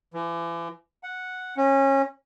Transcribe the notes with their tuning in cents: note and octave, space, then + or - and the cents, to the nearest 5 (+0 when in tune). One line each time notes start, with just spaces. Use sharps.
E3 +40
F#5 -5
C#4 -25